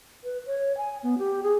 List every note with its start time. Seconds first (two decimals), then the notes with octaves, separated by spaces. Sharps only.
0.24 B4
0.46 C#5
0.77 G#5
1.03 B3
1.18 G4
1.43 G#4